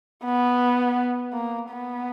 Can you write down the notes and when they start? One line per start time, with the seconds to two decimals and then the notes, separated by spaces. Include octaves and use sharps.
0.25 B3
1.33 A#3
1.70 B3